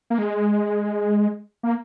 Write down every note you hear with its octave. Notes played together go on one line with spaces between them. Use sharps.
A#3
G#3
A#3